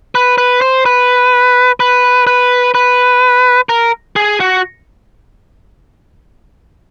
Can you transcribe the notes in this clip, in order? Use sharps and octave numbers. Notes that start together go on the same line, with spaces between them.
B4
B4
C5
B4
B4
B4
B4
A#4
G#4
F#4